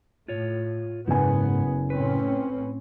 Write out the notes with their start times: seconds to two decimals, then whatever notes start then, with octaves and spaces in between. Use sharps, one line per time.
0.28 A2 F4 C#5
1.07 F#1 G#2 B3 G#5
1.90 A2 C4 C#4 B4